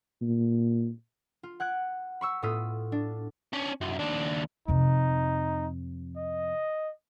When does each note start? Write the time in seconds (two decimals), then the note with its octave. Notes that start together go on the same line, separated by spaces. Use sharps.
0.21 A#2
1.43 F4
1.60 F#5 F#6 G#6 D7
2.21 B5 C#6 E6
2.42 A2 B3 F4 D#6 E6 B6
2.92 D4
3.53 C#4 D4
3.81 C2 F#2
3.99 D#2 D4
4.68 F2 C3 D#4
6.17 D#5